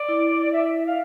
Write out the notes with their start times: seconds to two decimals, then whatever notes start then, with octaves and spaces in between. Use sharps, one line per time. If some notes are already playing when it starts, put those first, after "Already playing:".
Already playing: D5
0.08 E4
0.31 D5
0.41 D5
0.53 E5
0.75 E5
0.86 F5